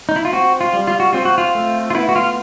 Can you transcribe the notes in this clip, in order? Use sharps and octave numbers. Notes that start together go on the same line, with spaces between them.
D#4
E4
F4
C4 F#4
F4
G3
F4
F#4
C4 F4
F#4
F4
A3
F4
B3 E4
F#4
F4